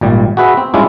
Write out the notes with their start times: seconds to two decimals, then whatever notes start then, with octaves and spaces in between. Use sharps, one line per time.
0.01 G#1 A#2 G3
0.37 F#4 G#4 B4 E5
0.57 C4
0.74 G3 G#3 C#4 D4 E4 F4